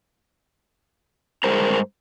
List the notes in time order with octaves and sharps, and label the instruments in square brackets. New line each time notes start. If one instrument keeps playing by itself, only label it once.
[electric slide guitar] G2 G#3 G#4 A#4 C5 A#5